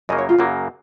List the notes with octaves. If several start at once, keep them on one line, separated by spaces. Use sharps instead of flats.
F#2 C#3 F#3 A#3 D#5
C#5
F4
F#2 C#3 F#3 A#3